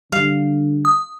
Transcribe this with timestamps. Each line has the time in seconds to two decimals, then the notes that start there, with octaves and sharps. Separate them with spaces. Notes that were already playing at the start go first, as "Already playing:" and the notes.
0.12 D3 G3 F5
0.85 D#6